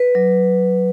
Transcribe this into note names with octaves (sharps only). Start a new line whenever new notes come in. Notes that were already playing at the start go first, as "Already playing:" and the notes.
Already playing: B4
F#3